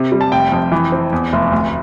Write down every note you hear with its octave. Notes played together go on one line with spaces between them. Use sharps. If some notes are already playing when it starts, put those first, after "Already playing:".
Already playing: C3
G3
A5
F1 G5
F2
E3
C4
E2
F1
D2